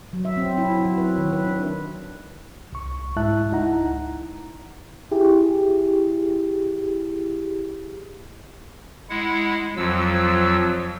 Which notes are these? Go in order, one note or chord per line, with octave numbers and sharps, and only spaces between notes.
F#3
E5
C4
E4
F#4
F#3
B4
D#3
B4
D4
C2 C#6
G#2 G#3 E4 E5 A5 F#6
C#2 D#4 E4 F#5 A#5
E4 G4 G#4
G#3 E4 F#5
F2 F3 F#3 E6